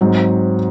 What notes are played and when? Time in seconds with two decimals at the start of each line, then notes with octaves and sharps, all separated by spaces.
0.01 G#2 F#3 C4